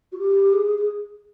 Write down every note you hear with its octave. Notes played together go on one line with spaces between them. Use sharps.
F#4
G4
G#4
G#4